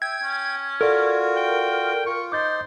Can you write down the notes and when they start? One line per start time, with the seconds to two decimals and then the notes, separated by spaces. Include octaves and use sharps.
0.02 E5 G5 G#6
0.23 C#4
0.81 F4 F#4 A4 A#4 D5
1.36 G5
2.06 F4 C#6
2.32 D#4 C5 D6 G6 A6